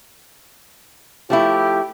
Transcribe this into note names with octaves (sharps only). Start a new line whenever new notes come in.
F3 A3 E4 G4